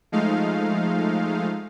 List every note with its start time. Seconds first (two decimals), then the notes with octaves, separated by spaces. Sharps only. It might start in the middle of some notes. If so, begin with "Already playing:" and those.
0.12 F3 G#3 A3 D#4 F5